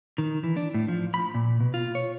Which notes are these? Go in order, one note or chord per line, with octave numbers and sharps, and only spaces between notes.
D#3
E3
D4
A2
F3
B5
A#2
B2
F4
C#5